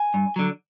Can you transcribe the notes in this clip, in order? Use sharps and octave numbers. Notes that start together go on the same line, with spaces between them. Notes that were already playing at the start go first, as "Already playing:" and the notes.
Already playing: G#5
G2
D3 F#3